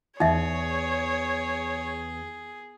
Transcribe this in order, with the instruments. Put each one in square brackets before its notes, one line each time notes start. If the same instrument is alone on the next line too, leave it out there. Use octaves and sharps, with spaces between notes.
[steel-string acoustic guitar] E2 [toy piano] D#4 E5 [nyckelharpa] G#4 [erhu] C#5